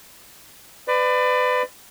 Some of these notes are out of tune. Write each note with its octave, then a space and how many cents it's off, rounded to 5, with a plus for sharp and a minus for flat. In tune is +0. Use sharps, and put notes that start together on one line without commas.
B4 +30 D5 +25